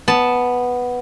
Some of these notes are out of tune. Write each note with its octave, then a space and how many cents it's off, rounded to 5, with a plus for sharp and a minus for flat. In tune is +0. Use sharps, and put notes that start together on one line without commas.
B3 +0 A5 -10